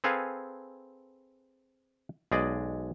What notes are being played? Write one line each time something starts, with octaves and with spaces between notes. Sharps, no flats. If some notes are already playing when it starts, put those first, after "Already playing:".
C4 G#4 A4 B4 F5 G#5
B1 G#3 G#4 D5 D#5